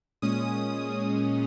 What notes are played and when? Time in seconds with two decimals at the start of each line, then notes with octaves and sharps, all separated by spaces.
0.22 A#2 G#3 C#4 D#6
1.10 D#6